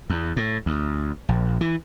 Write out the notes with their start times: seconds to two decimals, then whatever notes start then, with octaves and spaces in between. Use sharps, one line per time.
0.10 E2
0.36 A2
0.66 D2
1.29 A#1
1.61 E3